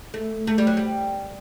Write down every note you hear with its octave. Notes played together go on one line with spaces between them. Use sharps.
A3
A3
G3
F#3
G3